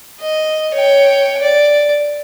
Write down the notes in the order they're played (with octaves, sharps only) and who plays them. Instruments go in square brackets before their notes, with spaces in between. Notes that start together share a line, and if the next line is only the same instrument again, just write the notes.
[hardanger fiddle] D#5
C#5 G5
D5